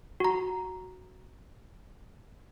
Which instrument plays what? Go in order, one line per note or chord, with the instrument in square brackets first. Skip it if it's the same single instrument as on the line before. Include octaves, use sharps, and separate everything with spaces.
[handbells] F#4 A#5